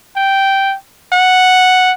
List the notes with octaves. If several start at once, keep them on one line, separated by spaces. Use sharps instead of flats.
G5
F#5